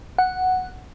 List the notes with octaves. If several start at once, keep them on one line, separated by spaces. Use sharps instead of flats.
F#5